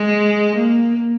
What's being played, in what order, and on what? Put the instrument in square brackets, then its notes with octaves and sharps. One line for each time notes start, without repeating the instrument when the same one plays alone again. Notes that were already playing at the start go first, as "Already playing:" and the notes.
Already playing: [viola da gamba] G#3
A#3